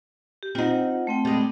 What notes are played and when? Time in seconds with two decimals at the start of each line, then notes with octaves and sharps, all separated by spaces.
0.43 G4
0.55 C4 D#4 F4 F#5
1.07 A3 C4 G5
1.25 G3 G#3